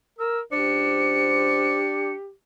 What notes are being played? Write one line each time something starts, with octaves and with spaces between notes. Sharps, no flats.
A#4 E6
C#2 D4 G4 C5 C#7